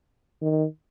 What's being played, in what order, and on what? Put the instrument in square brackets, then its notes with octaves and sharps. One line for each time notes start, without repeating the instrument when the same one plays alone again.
[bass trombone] D#3